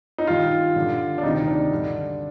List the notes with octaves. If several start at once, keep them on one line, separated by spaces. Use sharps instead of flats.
D#4
G2 D#3 F4
G2 D3
D4
D2 C3 D#3 D#4
D4
G2 D3